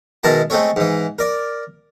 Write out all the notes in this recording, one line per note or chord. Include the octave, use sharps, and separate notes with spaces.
B2 D#3 G#3 E4 A5 A#5
G#3 A3 C4 A4 C#5
G#2 E3
A#4 D5